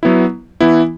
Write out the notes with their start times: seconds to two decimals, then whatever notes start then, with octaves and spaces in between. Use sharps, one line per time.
0.03 F#3 B3 E4
0.61 E3 B3 E4